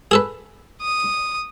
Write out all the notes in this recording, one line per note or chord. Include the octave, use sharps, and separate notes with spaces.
G#4 A4 B4
D#6